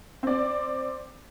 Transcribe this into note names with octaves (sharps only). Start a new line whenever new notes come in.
C4 D5